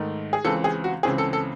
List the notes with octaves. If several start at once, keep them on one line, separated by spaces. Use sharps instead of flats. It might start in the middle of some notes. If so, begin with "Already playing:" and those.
Already playing: G#2 D#3 A3 D#4
G#4
C#2 C#3 E3 C4 A4
G#4
F#4
C#2 C#3 E3 C4 G#4
A4
A4